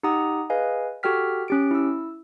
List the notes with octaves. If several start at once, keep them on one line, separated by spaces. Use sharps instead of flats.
D#4 G4 F#5 A#5 D#6
G#4 B4 D#5 F5 G#5
F#4 G4 A4 G5 F6 B6
C#4 G4 D7
E4 E6